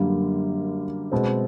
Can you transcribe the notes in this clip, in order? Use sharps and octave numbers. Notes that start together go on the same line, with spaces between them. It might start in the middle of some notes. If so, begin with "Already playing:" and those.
Already playing: F#2 D3 G3 A#3
B2 G#3 C4